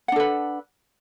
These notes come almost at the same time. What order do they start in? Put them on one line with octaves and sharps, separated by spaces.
F#5 D4 A4 B4